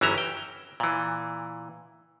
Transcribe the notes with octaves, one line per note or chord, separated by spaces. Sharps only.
G1 E3 F#3 C#4 E5 A#5
G5
A#2 E3